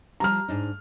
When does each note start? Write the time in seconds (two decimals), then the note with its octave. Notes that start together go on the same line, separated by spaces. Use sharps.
0.20 F3 G3 F4 A#5 F6
0.48 G#2 D4 D#4